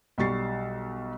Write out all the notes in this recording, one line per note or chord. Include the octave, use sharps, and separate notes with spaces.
B1 G3 C#6 A6 C7